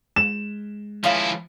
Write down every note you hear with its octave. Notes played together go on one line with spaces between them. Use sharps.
G#3 E7
C#3 E3 F3 E4 F5